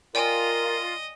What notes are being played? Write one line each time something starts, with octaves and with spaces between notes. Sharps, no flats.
F4 A#4 D5 D#5 G5 G#5